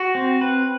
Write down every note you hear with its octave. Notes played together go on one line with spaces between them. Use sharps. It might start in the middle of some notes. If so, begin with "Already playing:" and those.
Already playing: F#4
C4
B4